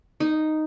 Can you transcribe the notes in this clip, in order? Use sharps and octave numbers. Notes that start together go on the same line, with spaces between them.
D#4